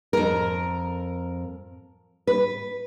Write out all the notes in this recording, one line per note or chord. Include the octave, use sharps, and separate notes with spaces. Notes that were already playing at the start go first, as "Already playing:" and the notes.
F2 A#4
B4